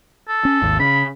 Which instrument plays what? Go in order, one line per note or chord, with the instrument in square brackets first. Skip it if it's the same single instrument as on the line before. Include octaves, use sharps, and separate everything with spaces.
[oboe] A4
[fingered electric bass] C#4
G#1 D#2
[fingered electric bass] C#3 [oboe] B5